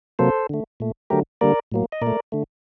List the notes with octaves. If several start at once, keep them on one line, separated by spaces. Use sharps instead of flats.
C3 F#3 A#3 A4 C5
D3 A3
A#2 A3
D3 F#3 A3 G4 A#4
D3 G3 A#3 A#4 D5
A2 F#3 A#3
D#5
A#2 A#4 D5
A3
D3 A3